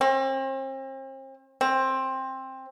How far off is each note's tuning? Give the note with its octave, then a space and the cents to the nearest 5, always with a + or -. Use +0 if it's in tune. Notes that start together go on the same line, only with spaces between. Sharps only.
C4 +40
C4 +15